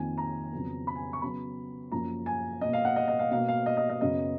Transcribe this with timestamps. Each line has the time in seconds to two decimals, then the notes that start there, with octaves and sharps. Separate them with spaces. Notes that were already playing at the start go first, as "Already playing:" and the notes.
Already playing: F2 D#3 A#3 G#5
0.18 A#5
0.53 F2 C#3 F#3 B3
0.87 B5
0.96 G#5
1.13 C#6
1.22 C#3 F#3 B3 B5
1.92 F#2 F3 A#3 A#5
2.26 G#5
2.61 B2 A#3 D#5
2.73 F5
2.85 F#5
2.96 D#5
3.08 D#5
3.19 F5
3.31 B2 A#3 F5
3.48 F5
3.66 D#5
3.77 D#5
3.90 D#5
4.01 F#2 C#3 F#3 B3 D#5